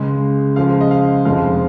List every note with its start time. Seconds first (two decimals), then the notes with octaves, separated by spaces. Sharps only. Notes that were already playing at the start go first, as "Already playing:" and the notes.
Already playing: C#2 C#3 G#3
0.56 C#2 C#3 F3 G#3 F5
0.81 D#5
0.91 F5
1.25 F1 F2 F3 G#3 F5